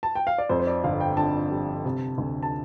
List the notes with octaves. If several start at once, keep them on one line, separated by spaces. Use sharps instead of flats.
A5
G5
F5
D5
F2 C5
C5
D5
G1 F5
G5
D3 A5
G3
C3
D2
A5